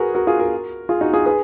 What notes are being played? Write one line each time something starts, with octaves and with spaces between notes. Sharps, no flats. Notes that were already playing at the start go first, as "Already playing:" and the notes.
Already playing: F#4 G#4 A#4 B4
F#4 A#4
F4 G#4
F#4 A#4
F4 G#4
D#4 F#4
F4 G#4
G#4 B4